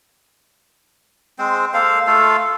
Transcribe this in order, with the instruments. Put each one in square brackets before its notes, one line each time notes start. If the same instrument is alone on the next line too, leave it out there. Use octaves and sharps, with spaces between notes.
[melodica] G#3 C4 C5
A#3 A4 C5 F5
A3 F4 A4 F5